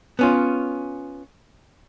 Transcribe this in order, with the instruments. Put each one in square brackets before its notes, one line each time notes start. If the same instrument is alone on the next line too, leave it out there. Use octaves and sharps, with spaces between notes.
[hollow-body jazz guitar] B3 C#4 F4